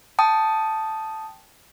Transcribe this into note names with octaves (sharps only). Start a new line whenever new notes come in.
G5 A5 D#6